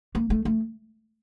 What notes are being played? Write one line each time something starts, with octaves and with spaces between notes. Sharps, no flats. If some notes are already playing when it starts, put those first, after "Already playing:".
A#3
A3
A3